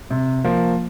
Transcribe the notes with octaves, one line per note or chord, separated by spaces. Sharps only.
C3
F3 A#3